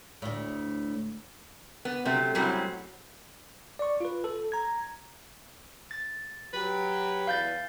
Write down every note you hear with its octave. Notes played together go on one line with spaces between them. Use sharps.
D2 A2
B3
C3 F#3 A3
F#2 A2 F#3 G3 C4
D5 C#6
F4 B4
A4
A#5 G#6
A6
F#3 G4 B4
E2 F5 G6 A6